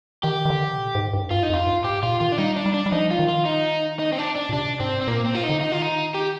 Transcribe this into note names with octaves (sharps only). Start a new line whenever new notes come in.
D#3 G4
D#3
D3
C3
A#2
G#2
G2
G2 F4
D#4
F2 F4
G2
G#2 G4
A#2 F4
D#3 F4
D4
G3 D#4
D4
G3
D4
G3
F3 D#4
F4
D#3
F4
D#4
D#4
C4
D4
D4
A#2
C3 D4
G#2 C4
C4
A#2 A#3
C4
F4
D#4
D3
D#3 D#4
F4
D#4
G4